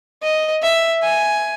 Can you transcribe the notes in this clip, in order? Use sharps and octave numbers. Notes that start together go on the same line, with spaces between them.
D#5
E5
G#5